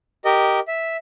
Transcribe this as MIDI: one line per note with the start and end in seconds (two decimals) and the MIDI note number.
0.25 0.60 67
0.25 0.60 70
0.25 0.60 75
0.68 0.97 76